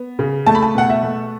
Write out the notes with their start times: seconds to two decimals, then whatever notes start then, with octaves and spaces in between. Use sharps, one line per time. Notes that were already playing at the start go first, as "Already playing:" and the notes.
Already playing: B3
0.19 C#3
0.46 A3 A5
0.55 B5
0.62 A5
0.75 B2 F#5
0.89 E5
1.03 A3